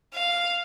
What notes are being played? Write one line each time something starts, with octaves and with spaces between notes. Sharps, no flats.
F5